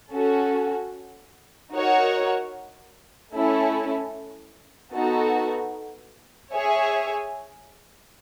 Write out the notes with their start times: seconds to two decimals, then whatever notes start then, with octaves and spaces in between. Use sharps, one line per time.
0.12 C#4 F#4 A4
1.71 D#4 F#4 A#4 C#5 F#5
3.33 A3 C#4 E4 A4
4.92 B3 D#4 F#4 A4
6.53 G#4 C#5 E5 G#5